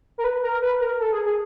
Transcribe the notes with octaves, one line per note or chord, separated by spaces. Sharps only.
A#4
B4
A#4
B4
A#4
A4
G#4
G#4